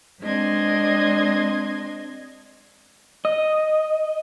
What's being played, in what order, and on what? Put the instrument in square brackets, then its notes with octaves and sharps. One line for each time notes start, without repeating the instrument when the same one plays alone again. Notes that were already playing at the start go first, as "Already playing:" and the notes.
[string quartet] G#3 C4 D4 D#5 C6 G#6
[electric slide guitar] D#5